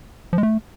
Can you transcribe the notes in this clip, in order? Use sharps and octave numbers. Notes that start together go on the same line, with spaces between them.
F3
G#3
A3